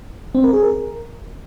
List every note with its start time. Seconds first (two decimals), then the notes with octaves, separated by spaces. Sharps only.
0.35 C4
0.44 A#4
0.53 G#4
0.63 A#4